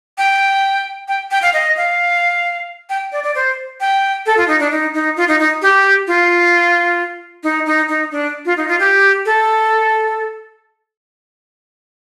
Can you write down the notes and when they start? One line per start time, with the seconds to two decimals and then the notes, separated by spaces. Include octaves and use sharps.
0.18 G5
1.08 G5
1.31 G5
1.42 F5
1.54 D#5
1.77 F5
2.90 G5
3.12 D5
3.24 D5
3.35 C5
3.80 G5
4.26 A4
4.37 F4
4.48 D#4
4.60 D4
4.71 D#4
4.94 D#4
5.17 F4
5.28 D#4
5.39 D#4
5.62 G4
6.07 F4
7.43 D#4
7.66 D#4
7.88 D#4
8.12 D4
8.45 F4
8.57 D#4
8.68 F4
8.79 G4
9.26 A4